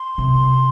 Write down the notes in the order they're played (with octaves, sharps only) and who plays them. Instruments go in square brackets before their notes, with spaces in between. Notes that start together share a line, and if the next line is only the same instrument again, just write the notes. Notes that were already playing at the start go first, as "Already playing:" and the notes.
Already playing: [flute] C6
[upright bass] C3